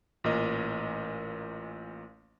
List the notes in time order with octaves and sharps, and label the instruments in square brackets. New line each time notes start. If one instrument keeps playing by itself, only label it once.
[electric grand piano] A1 A#2 A#4 D#5